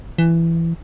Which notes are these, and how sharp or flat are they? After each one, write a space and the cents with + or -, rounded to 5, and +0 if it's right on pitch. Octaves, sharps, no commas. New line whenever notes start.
E3 +15